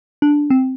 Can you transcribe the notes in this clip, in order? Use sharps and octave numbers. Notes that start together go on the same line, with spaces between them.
D4
C4